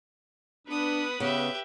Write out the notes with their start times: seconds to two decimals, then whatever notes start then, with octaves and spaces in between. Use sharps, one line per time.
0.67 B3 D4 B4 D#6
1.20 C#3 B3 G4 E5